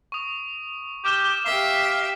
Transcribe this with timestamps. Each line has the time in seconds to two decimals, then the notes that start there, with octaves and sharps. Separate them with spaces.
0.12 C#6 D#6
1.05 G4 D6 F6 E7
1.45 G4 E5 F5